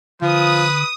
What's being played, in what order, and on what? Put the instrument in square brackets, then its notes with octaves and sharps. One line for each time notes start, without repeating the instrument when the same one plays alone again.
[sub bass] D3 [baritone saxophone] F3 [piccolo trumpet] B4 [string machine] D#6